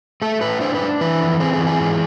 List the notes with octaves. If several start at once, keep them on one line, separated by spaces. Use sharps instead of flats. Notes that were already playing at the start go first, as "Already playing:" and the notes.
A3 A4
A2 B4
D4 C5
B4
D4
E3 B4
F2
C4 G#4
G#4
E3
G#4
G#2